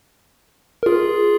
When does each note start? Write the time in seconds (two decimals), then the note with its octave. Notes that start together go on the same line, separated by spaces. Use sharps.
0.83 A#4
0.86 F4 G#4